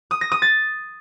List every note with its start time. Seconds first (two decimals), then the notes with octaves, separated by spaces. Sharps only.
0.11 D#6
0.21 A#6
0.32 D#6
0.42 A6